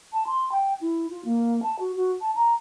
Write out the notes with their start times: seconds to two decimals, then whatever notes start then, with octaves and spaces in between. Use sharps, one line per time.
0.13 A5
0.27 C6
0.52 G5
0.81 E4
1.11 F4
1.25 A#3
1.63 A5
1.79 F#4
1.96 F#4
2.21 A5
2.36 A#5